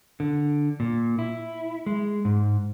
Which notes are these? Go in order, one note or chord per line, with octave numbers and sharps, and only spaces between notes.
D3
A#2
E4
G#3
G#2